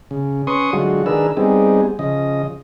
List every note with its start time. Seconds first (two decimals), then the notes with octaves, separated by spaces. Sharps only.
0.11 C#3
0.47 C#4 B4 C6 C#6 D#6
0.73 D3 F#3 G#3 F4 F#4
1.06 D#3 D4 G#4 A#4 B4 E6
1.37 G3 B3 C4 D#4 G#4
1.99 C#3 F3 D#5